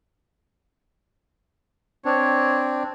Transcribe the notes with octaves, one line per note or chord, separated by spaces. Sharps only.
C4 D4 C#5